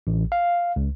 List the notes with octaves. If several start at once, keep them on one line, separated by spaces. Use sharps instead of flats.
A1
F5
C#2